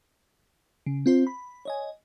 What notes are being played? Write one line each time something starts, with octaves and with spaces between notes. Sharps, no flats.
C#3
C4 F4 C5
B5
C#5 D#5 G#5